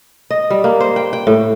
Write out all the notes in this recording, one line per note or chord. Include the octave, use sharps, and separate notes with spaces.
D#5
G3
A#3
C5
G5
G5
A2